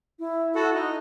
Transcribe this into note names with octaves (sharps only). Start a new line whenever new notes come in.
E4
F#4 A4 F#5
D#4 D#5